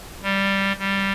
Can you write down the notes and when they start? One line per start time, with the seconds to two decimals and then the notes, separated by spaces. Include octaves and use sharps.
0.23 G3
0.78 G3